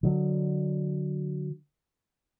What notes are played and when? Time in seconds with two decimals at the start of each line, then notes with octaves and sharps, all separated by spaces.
0.03 D3 F#3